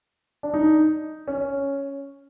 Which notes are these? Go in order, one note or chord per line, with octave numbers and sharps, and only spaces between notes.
D4
D#4
C#4